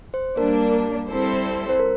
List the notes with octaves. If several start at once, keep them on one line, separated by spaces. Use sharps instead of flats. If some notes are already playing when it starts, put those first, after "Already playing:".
C5
G3 A#3 D4 A#4
G3 C4 E4 A4 C5
C5
A#4